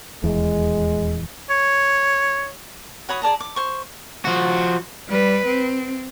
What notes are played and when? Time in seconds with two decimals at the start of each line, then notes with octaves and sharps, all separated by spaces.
0.24 D#1 E2 G#3
1.50 C#5
3.09 F#4 C#5 B5 D#6
3.22 G#4 D5 A5 A#5
3.40 D6
3.56 C5 C#6
4.25 F3 F#4
5.09 G3 B4
5.47 C4